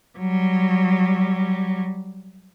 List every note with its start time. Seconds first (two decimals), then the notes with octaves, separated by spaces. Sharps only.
0.18 F#3 G3